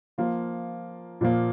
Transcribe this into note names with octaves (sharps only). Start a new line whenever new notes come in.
F3 A#3 F4
A#2 F3 A#3